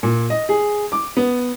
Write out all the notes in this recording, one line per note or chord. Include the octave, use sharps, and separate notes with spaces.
A#2
D#5
G#4
D6
B3